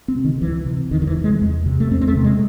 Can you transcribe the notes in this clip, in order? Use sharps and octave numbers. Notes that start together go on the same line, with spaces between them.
C4
C3
D#3
C#2 E3
C3
E2 D#3
D#3
E3
C3
G#3
E2
C3
A3
E2 C4
C4
A3
C3
G#3